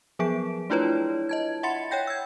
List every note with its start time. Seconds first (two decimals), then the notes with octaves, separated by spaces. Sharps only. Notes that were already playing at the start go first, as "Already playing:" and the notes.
0.19 F3 F#3 B3 G#4 D7
0.70 A3 D4 E4 F4 B4 C#5
1.29 D#5 A5 G#6
1.63 E5 F#5 B5 C6 A6 C#7
1.91 C#5 F#5 G5 G6 A#6
2.07 E6 G#6